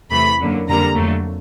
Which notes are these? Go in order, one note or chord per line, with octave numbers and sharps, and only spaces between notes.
E2 C3 E3 A3 B5
F#2 D3 F#3 A#3
F2 D3 G3 A#3 A#5
F2 D3 F#3 A3